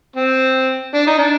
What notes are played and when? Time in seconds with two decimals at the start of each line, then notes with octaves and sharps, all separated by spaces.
0.16 C4
0.94 D4
1.07 D#4
1.19 D4